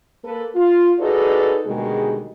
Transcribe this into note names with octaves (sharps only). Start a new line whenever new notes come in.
A#3 A4 B4
F4
D#4 F#4 G#4 A4 B4 D5
D2 B2 D#3 G3 G#3 G#4